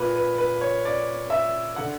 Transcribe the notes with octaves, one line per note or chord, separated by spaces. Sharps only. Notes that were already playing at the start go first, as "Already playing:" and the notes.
Already playing: A#2 B4
B4
B4
C#5
D5
E5
D3 F#5